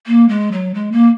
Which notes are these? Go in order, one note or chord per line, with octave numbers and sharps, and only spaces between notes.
A#3
G#3
F#3
G#3
A#3